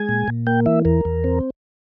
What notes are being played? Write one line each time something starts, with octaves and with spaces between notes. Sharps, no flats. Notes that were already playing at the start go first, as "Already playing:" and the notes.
Already playing: G#3 G#5
A#2
A#2
A#3 G5
E3 E5
E2 A#4
E2
C4